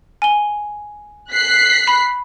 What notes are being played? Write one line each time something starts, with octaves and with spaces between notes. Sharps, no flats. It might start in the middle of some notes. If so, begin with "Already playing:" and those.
G#5 G7
F#6 B6 C7
B5